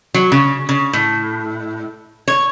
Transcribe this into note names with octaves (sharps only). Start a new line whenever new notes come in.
F#3
C#3
C#3
A2
C#5